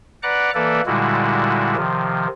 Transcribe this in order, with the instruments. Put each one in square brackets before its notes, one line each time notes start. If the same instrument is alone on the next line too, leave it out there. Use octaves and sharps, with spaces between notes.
[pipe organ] B4 D5 F#5 A#5 D6 F#6
E3 A#3 A4 B4 D5
A#2 D3 G3 G#3 E4 F#4
C3 D#3 F3